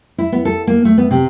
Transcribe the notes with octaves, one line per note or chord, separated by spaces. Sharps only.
E4
B3
A4
A#3
A3
B3
C3